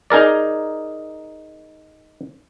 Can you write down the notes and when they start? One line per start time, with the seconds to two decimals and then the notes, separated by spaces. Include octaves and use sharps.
0.10 D#4 G#4 A#4 D5